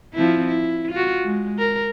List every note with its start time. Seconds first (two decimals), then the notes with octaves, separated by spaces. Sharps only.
0.14 F3 C4 E4
0.47 E4
0.91 F4 F#4
1.24 G#3
1.59 A#4